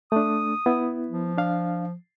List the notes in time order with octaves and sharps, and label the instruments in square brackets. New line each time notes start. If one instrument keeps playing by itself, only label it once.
[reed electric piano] A3 D4 [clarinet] D#6
[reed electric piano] B3 E4
[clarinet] F3
[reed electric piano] D4 F5